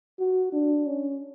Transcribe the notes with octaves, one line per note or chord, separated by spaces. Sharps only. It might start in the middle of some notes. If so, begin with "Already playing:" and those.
F#4
D4
C#4